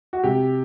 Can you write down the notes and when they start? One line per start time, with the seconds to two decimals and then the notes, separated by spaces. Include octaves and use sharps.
0.13 F#4
0.24 C3 G4